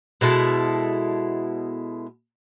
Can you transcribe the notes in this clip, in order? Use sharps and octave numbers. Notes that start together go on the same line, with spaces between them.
B2 G#3 E4 A4